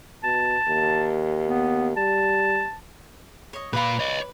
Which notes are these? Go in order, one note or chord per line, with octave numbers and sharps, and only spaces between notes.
B2 A5
D#2
B3
G3 A5
C#5 D#5
A#2 B4 D5 F5 B5
C#5 D#5